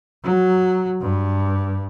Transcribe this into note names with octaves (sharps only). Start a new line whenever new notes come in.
F#3
G2